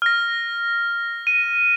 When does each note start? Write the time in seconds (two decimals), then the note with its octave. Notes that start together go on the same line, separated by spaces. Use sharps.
0.02 F6 A#6
1.27 D#7